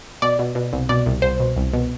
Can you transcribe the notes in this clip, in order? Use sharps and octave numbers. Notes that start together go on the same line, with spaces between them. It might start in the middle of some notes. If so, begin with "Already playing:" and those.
B2 D5
B2
B2
C2
B2 D5
C2
C2 C5
B2
C2
B2